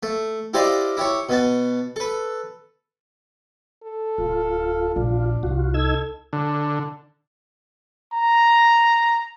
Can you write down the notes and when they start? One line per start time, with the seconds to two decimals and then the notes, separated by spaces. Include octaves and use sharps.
0.03 A3
0.54 E4 G4 C5 D5 D#5 F5
0.97 E4 G4 C#5
1.29 B2 B3 A5
1.96 A4 B4
3.83 A4
4.18 D1 F4
4.96 A#1 D#2 D4
5.43 C2 F4 F#4
5.74 D#4 A4 E6 G#6
6.33 D3
8.13 A#5